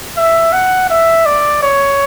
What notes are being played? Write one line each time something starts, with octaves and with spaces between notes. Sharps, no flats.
E5
F#5
E5
D5
C#5